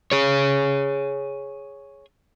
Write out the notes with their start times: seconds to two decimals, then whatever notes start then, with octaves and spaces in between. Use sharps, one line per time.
0.12 G#4 C#5